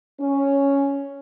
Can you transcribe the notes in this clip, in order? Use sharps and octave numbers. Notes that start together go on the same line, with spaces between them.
C#4